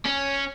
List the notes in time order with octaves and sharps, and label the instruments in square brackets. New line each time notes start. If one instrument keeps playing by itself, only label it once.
[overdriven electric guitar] C#4